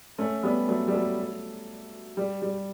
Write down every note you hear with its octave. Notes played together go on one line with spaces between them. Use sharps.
A3 C#4
G3 B3
F#3 A3
G3
F#3 A3
G3
G3